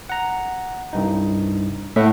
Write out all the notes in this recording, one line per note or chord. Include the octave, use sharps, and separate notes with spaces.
F#5 A#5
C2 G2 D#4
A2 E5 F#5